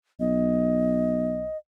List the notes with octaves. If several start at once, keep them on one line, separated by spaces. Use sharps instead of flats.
B1 D#5